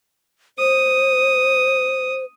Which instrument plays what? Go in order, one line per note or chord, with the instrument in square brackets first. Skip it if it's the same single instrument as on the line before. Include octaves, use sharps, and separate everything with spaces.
[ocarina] C5 [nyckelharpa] D#6